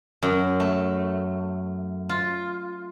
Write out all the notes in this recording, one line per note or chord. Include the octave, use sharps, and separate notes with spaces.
F#2
A3
F4